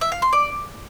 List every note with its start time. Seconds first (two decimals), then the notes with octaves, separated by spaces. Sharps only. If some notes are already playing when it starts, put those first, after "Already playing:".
0.01 E5
0.12 F5
0.22 C6
0.33 D5